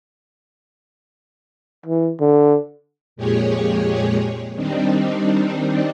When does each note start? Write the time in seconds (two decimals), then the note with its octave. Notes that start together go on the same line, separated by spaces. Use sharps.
1.86 E3
2.20 D3
3.16 F2 A#2 G#3 G4 G#4 C#5
4.56 D#3 G3 C4 D4 D#4